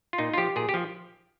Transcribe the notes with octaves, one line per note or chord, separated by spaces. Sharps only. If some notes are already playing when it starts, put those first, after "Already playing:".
F4
A#2 D#4
F4
F3 G4
A#2 G#4
G4
F3